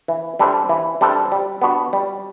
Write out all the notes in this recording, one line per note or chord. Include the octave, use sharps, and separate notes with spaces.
E3
G3 D4 A4 C5
E3
G3 D4 A4 C5
G3
B3 D4 F#4
G3